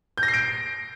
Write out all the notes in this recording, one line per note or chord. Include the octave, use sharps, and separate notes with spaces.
G6
A#6
C7
D7